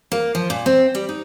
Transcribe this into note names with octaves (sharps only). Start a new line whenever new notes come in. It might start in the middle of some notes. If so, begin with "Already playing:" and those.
A#3
F3
A#2
C4
G3
D#4